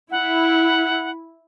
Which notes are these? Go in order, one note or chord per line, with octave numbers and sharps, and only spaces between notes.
E4 F#5